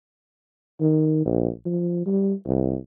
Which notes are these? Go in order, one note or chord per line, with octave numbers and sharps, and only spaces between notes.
D#3
A#1
F3
G3
C2